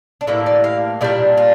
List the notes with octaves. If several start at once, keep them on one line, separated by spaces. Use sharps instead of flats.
D4
A2 E3 G3 A#3 E4
D5
F5
A#2 G3 D4 D5
F4